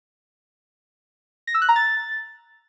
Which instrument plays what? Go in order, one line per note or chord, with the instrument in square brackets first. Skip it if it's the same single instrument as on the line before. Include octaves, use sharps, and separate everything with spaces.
[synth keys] A#6
E6
F#6
A#5
A6